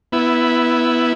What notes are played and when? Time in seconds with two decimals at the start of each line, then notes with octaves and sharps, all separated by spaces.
0.12 B3 E4